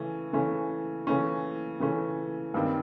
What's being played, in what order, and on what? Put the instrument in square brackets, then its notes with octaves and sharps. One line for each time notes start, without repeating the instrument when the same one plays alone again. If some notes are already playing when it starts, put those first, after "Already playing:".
Already playing: [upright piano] C#3 E3 A3 C#4
C#3 E3 A3 C#4
C#3 E3 A3 C#4
C#3 E3 A3 C#4
G2 D#3 G3 C4